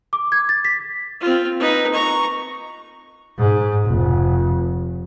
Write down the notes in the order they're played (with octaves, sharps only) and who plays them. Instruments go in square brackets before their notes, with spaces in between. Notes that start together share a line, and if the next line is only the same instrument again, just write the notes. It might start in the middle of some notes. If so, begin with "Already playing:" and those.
[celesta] D6
G#6
A6
B6
[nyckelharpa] C4 F4
D#4 B4
A#5 C#6
[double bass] G#2
F1